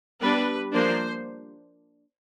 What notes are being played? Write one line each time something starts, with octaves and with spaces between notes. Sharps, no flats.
G3 B3 D4 B4
F3 A#3 D4 C5